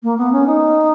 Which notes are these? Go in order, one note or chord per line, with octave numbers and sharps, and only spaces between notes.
A#3
B3
C#4
D#4